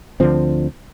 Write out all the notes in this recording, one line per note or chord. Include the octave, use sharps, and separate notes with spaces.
D2 D3 F3 C4